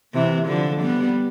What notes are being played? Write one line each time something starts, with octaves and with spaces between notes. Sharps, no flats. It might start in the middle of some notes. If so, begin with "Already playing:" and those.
C3 E3
D3 F3
G3 B3